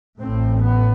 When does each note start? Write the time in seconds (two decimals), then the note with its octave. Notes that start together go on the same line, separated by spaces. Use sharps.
0.20 A1 A2 C4
0.62 B3